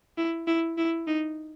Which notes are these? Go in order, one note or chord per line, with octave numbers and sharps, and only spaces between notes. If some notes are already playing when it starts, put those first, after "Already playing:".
E4
E4
E4
D#4